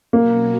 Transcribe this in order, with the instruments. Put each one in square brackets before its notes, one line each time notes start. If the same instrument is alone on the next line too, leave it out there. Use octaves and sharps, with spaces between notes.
[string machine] B2 F#3 C#4 F#4 [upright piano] A#3